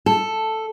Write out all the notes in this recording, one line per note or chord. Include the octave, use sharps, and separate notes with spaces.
A4